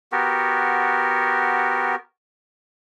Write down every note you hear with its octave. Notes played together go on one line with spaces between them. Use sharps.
B3 F#4 G4 A#4